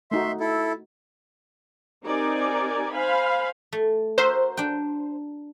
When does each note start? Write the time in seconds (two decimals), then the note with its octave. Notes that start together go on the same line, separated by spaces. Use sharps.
0.11 A3 D#4 F#4 E5 C6
0.40 E4 A4
2.05 C4 D#4 G4 A#4 D5 G#5
2.93 C5 F5 G#5 B5
3.73 A3
4.18 F#4 A#4 C5 E5
4.57 D4 G5